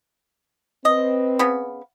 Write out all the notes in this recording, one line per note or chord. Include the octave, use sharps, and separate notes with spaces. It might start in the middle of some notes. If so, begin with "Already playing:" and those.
C4 B4 D#5
C#3 B3